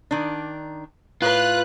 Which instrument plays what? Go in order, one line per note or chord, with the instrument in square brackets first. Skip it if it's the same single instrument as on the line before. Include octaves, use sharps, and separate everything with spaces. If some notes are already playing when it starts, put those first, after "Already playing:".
[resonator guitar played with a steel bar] D#3 D4
[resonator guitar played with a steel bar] A2 [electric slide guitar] F4 [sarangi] B4 [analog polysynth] F#6